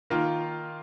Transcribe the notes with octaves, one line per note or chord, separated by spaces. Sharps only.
D#3 A#3 F4